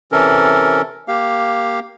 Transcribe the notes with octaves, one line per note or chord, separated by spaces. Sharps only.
C3 E3 C#4 A4 A#4
A#3 G4 F5